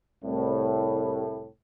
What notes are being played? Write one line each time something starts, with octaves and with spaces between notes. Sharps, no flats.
C2 A2